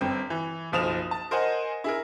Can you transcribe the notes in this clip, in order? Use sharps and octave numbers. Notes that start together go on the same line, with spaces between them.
G1 C4 G5
E3
F#1 B1 F3 D#6 E7 F7
A5
A#4 C5 D#5 F#5 G#5
E4 G#4 A#4